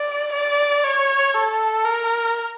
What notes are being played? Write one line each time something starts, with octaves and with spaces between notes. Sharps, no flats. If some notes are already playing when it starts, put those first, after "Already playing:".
Already playing: D5
D5
C#5
A4
A#4